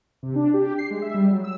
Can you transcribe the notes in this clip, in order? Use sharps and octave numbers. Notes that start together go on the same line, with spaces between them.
C3
D4
G4
C7
G#3
E5
G3
F#3
E6